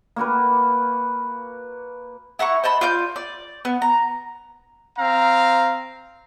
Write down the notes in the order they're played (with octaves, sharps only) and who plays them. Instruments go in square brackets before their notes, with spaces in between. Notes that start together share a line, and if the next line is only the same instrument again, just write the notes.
[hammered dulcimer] A#3 F#4 A#4 B4
[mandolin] E4 F#5 A#5 C#6
C5 D#5 A5 B5
F4 D5 G6
D5
B3
A#5
[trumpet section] C4 F5 A#5